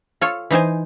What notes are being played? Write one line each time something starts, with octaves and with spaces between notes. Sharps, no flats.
F4 A4 C#5
E3 D#4 C5 G#5